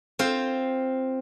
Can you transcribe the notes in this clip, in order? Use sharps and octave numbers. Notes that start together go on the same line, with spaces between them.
C4 F4 C5